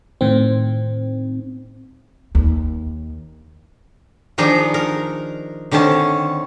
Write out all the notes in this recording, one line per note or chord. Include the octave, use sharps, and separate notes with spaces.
A2 D#3 C4
D#2
D#3 F3 D4 D#4 G#4
A#4
D3 D#3 C4 C#4 A5